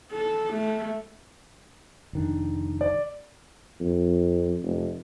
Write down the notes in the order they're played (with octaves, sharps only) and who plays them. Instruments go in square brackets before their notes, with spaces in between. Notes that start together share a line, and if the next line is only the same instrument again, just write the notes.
[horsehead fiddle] A4
A3
[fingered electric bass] F1 D#3 D4
[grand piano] D5
[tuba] F2
F1